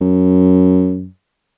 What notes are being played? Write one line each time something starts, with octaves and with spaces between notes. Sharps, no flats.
F#2